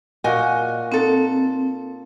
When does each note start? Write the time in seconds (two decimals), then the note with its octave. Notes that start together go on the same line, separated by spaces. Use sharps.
0.24 A#2 F#4 D#5 G#5
0.92 C4 D#4 A4